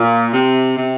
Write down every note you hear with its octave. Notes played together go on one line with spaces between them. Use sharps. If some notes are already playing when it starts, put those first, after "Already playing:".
Already playing: A#2
C3
C3